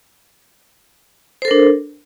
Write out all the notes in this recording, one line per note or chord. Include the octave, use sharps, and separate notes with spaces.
D4 A4 A#4 C5